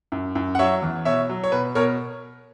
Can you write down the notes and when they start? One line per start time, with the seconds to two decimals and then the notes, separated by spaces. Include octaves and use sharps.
0.12 F#2
0.35 F#2
0.55 F#5
0.59 F#3 C#5 E5
0.82 E2
1.05 B2 C#5 E5
1.29 F#3
1.44 C#5
1.52 B2 B4
1.75 B2 A#4 C#5